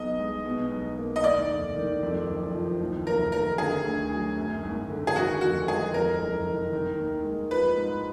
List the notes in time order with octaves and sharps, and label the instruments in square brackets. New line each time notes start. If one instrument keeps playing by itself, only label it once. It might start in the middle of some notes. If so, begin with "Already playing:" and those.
Already playing: [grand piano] B1 B2 [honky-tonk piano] D#5
[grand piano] G#3
B2
B1
A#3
[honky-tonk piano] D#5
[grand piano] D#2 [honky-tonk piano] D5
[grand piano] F1
D#3
F2
F#1
F3
D#2
[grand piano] F1 [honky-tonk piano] A#4
[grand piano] D#3 [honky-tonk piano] A#4
[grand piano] D3 [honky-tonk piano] G#4
[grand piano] D2
F#3
F#2
G#1
D3
[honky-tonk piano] G#4
[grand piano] D#3 [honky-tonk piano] F#4
[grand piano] F2 [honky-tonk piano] F#4
[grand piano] G#3 [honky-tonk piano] G#4
[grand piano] F2 [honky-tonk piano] A#4
[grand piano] F#1
D#3
D#3
D#2
G#3
[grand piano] F3 [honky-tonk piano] B4
[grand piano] G#2